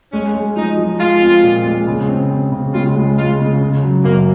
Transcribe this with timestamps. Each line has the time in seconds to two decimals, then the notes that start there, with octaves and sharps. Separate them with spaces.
0.13 G#3 C#4
0.34 G#3
0.56 F3 D#4
0.78 F3
1.00 G#3 F4
1.21 C4
1.43 A#2
1.66 G#3
1.87 C#3
2.09 C4
2.30 C4
2.52 C#3
2.74 C#2 F4
2.95 G#3
3.18 G#3 F4
3.39 C#3
3.62 C#3
3.83 F#3
4.04 F#2 A#3